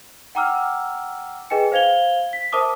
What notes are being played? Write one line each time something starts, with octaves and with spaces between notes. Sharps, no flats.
F#5 G5 A#5 D6 E6 F6
G#4 B4 D#5 G5 G#5 C#7
C5 F5 G#6 F7 G7
B6
A#4 C5 E5 A5 D6 D#6